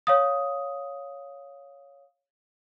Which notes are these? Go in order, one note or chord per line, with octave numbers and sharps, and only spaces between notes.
C#5 F5 D#6